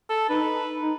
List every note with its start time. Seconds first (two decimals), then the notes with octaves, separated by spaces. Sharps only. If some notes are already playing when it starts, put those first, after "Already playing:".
0.10 A4
0.30 D#4 B4
0.82 D#4